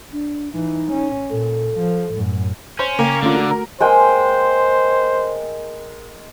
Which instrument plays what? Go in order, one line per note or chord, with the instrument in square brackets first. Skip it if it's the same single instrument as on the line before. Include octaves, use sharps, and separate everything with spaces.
[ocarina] D4
[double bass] E3 [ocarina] D#4
[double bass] C#4
[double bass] A#2 [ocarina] A4
[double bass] F3
F#2 A2
[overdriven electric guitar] C#4 [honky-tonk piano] C5
[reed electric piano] C#3 G5 [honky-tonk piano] A#3
[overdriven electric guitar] D3 [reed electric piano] A3 C#4 F4
[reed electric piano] A3 F#4
[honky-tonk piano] A#4
[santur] G#3 A#3 G5 [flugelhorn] C5